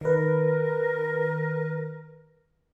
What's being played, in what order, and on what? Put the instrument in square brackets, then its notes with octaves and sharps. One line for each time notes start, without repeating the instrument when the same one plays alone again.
[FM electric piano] D#3 B4 [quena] A#4